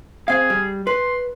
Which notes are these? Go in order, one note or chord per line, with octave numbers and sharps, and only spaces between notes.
C4 G#4 F5
G3
B4 C6